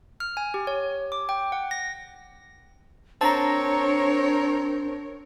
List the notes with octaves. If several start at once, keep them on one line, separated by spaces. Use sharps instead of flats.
F6
G#5
G4
C#5
D6
G5
F#5
A#6
C4 D4 A#4 C#5 A5 A#5